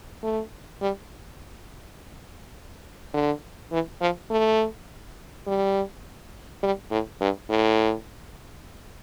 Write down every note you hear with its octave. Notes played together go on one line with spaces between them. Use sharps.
A3
G3
D3
E3
F3
A3
G3
G3
A2
G2
A2